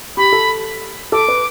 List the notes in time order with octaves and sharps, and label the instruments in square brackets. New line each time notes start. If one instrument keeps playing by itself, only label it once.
[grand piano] G4 [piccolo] B5
[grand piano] A4
[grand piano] A4 [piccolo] D6
[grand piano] B4